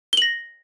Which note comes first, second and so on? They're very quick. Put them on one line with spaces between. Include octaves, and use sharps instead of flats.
G7 F#7 A#6